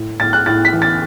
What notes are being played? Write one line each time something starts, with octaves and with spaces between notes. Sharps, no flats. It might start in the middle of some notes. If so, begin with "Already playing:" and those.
Already playing: A2
A2 A6
F#6
A2 A6
B6
E3
A6